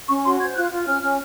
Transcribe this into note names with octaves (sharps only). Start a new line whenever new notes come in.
C#4 C#6
F#4 C6
C5 G#6
F4 F#6
F4
C#4 F6
C#4